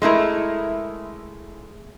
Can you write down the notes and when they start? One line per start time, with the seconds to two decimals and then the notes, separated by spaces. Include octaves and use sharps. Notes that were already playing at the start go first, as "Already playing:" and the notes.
0.02 G#3 A3 E4 A#4